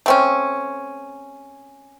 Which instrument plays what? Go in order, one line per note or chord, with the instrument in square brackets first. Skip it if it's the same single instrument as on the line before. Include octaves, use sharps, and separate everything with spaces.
[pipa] A3 C4 C#4